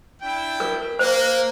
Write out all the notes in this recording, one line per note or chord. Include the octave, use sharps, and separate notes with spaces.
D4 E4 G5
A#4
A#3 C5